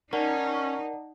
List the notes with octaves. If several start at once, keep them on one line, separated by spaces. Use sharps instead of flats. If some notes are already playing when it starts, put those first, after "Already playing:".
C#4 D#4 A#4 D5 F#5 A5